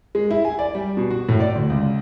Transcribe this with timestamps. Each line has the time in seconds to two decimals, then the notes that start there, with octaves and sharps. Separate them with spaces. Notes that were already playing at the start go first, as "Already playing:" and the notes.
0.15 G#3
0.31 E4
0.45 G#5
0.59 D5
0.75 G3
0.97 B2
1.11 F#4
1.29 A2
1.40 D5
1.55 D2
1.70 C#2